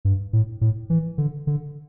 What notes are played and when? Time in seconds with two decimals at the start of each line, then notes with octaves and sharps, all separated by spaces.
0.05 G2
0.33 A2
0.61 A2
0.90 E3
1.18 D3
1.47 D3